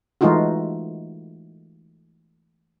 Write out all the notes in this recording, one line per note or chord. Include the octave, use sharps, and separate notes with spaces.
E3 G#3 A3 D#4 F4 F#4